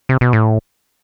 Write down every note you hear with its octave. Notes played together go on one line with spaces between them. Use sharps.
C3
B2
A2